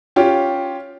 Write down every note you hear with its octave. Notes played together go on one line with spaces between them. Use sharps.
C#4 F4 G4